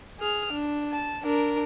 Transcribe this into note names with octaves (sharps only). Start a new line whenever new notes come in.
G#4 F6
D4
A5
D4 A#4